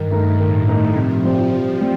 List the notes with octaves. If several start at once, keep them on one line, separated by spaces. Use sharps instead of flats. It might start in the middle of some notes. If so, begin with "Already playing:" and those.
Already playing: G2 D#3
A3 D#4 A#4
A2 D#3
A3 D#4 A#4
C3 F3
G3 C4 G4 C5
C3
G3 C4